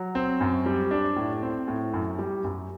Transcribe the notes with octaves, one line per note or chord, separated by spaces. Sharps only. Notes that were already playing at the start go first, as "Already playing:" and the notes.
Already playing: F#3
C4
F#2
G3
D4
A2
C4
A2
F#2
G3
F#2